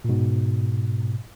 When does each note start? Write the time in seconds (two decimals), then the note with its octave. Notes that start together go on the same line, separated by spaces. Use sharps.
0.04 A#2
0.09 G#2 B2